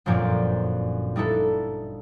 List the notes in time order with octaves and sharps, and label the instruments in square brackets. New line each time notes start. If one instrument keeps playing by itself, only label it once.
[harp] G1 F#2 A#2 F3 C4 D5
G3 D#4 E4 A4 B4